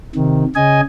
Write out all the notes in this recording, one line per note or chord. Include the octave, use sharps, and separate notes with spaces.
C3 D#3
C#3 D#5 G#5